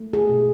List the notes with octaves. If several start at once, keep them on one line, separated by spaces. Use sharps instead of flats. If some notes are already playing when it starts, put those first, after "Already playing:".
Already playing: A3
G#4
B2